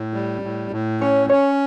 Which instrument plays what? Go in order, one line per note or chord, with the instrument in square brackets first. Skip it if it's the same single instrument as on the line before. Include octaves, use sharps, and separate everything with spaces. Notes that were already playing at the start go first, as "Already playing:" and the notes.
Already playing: [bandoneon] A2
G3
A2
A2
[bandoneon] C#4 [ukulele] C#5
[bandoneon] C#4 [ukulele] C#5